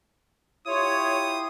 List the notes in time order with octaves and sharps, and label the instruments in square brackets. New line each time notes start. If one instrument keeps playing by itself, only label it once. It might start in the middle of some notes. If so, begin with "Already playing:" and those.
[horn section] E4 F4 G4 [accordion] C#5 [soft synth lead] C6 [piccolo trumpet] D#6